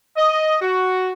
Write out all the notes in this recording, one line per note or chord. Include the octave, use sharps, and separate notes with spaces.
D#5
F#4